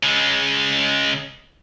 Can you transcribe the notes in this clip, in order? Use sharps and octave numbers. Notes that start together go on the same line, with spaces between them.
C#3 G#3